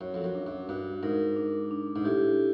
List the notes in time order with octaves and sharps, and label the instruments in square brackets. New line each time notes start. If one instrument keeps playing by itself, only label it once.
[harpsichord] F#2 [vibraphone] C#5
[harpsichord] F2
F#2
[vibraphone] D4
[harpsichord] F#2
[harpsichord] G2 [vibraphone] F#4
[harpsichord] G#2 [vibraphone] A#4
[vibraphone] D4
D4
[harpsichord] G#2
[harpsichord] A2 [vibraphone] G4